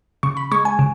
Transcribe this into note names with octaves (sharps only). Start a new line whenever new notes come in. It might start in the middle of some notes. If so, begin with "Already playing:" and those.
C#3 C#6
B5
G#3 C#6
G#5
C#3